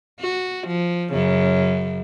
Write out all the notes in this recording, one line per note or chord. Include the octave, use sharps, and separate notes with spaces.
F#4
F3
F#2 C#3